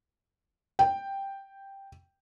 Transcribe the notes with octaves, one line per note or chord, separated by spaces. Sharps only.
G5